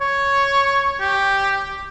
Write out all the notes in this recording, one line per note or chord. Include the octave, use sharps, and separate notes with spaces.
C#5
G4